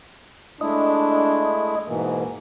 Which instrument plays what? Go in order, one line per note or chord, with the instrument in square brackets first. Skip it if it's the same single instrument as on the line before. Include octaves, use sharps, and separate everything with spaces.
[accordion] G#3 A3 E4 [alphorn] D4 [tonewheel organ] D#5
[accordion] G#2 B2 E3 [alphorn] A#3